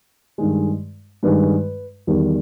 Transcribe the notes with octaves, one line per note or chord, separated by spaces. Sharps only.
G2 D#3 G#3
G2 D#3 G#3 B4
E2 D#3 G3 A#4